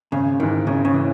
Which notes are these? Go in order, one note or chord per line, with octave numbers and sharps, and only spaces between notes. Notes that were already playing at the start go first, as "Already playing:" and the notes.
G#1 C#3
G#2 D#3 E3
G#1 C#3
C#3
E3